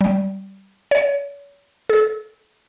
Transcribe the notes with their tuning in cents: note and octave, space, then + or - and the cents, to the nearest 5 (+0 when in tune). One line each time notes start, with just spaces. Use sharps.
G3 -15
C#5 +35
A4 -30